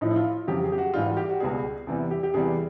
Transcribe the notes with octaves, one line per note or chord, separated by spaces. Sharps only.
A2 F3 D#4
E4
F4
F2 C#3 F#3 G4
G#4
G4
F#4
G#2 E3 G3 F4
F#4
G4
F#4
C#2 B2 G3 G#4
E2 C3 E3 G3
G4
G4
E2 C3 E3 G3 G#4